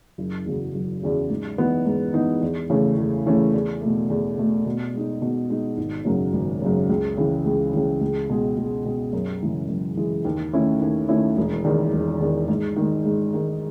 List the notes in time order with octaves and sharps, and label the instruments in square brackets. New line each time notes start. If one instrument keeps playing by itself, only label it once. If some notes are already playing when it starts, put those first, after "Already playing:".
[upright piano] F#1
E2 C#3 F#3
F#1
E2 C#3 F#3
G#2
E3 B3 D#4
G#2
E3 B3 D#4
E2
C#3 E3 A3 C#4
E2
C#3 E3 A3 C#4
E2
B2 A3
E2
B2 A3
B2
G#3 D#4
B2
G#3 D#4
G#1
F#2 C#3 F#3
G#1
F#2 C#3 F#3
C#2
C#3 E3
C#2
C#3 E3
C#2
B2 G#3
C#2
B2 G#3
F#2
C#3 E3 G#3
F#2
C#3 E3 G#3
D#2
D#3 A3 C#4 E4
D#2
D#3 A3 C#4 E4
E1
E2 D#3
E1
E2 D#3
G#2
D#3 G#3
G#2
D#3 G#3